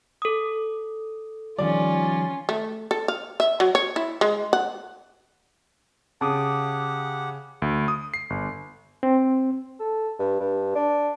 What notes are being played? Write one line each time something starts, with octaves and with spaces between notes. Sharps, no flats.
A4 D#6
D#3 F3 G3 C#4 F4 D5
A3
A4
F5
E5
F#3
C#5
E4
G#3
F#5
C#3 G4 F#5 A5 D6 D#6
D2
D#6
C7
G1
C4
A4
G2
G2
D4